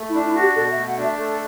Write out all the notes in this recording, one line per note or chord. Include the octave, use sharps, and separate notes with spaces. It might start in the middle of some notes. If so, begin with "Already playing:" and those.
Already playing: A3
E4
D4
E4
F#4 G4
B2 A4
E5
A3
F#5
D4
E5
A3 A4